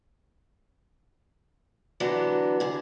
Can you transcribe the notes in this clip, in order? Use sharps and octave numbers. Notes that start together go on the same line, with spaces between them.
D3 E3 F#3 B3 D4 G4
D3 G#4